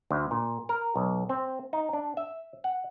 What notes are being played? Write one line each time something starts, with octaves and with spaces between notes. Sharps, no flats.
D2
A#2
A#4
B1
C4
D#4
D4
E5
F#5